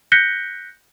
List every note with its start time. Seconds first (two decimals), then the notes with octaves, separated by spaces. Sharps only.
0.12 F#6 G6 A#6 B6 C#7 G7